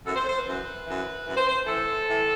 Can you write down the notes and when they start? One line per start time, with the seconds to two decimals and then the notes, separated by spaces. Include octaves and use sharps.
0.04 F#2 E3 A4
0.15 C5
0.25 C5
0.36 B4
0.45 F#2 E3
0.85 F#2 E3
1.26 F#2 E3
1.35 C5
1.46 C5
1.66 A2 E3 A4
2.06 A2 E3